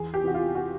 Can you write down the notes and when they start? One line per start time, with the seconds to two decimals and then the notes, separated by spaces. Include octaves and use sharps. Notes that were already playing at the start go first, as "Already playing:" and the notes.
Already playing: E2 G#4
0.14 G4
0.24 C3 E3 F#4
0.34 F4
0.55 F#4